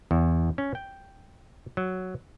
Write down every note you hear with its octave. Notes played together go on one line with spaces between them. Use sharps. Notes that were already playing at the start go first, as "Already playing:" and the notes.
E2
C#4
G5
F#3